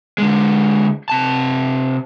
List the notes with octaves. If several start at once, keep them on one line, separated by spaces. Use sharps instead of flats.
D3 G#3
C3 A5